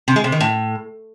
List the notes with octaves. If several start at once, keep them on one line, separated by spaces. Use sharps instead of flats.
C3
G#3
C3
D#3
A2